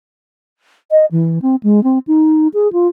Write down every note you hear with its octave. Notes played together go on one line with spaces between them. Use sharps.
D#5
E3
C4
G#3
C4
D#4
G#4
F4